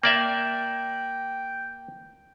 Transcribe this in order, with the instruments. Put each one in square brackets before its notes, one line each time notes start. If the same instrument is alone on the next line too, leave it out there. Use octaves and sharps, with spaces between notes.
[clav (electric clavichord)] A#3 D5 E5 [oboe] G5